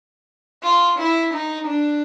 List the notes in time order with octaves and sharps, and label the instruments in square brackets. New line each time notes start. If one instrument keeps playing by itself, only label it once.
[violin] F4
E4
D#4
D4